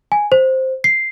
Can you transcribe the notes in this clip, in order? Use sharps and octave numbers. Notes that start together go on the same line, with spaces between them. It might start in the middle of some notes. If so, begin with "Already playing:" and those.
G#5
C5
C7